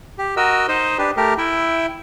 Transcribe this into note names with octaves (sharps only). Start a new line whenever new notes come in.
G4
F#4 A#4 D#5 E6
D#4 C5 D#5
D4 G4 B4
A3 G4 A#4
E4 E5 G5